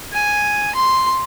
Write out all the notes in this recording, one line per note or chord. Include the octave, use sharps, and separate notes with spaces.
G#5
C6